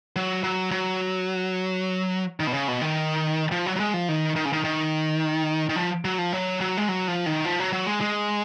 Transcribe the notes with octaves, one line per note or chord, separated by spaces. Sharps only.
F#3
F#3
F#3
D#3
B2
C#3
B2
D#3
F3
F#3
F#3
G#3
F3
D#3
D#3
C#3
D#3
D#3
D#3
F3
F#3
F3
F#3
F#3
G#3
F#3
F3
D#3
F3
F#3
F#3
G#3
G#3